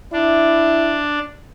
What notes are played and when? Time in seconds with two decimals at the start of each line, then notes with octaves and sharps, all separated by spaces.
0.13 D4 E4